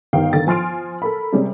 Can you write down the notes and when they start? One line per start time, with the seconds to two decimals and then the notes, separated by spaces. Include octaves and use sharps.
0.13 G1 D#3 D#4 G4 F5 G5
0.33 D3 D#3 A6
0.47 F3 G#5 C6 F6 D7
1.02 A4 A#4 B5
1.33 C3 G3 G#3 C#4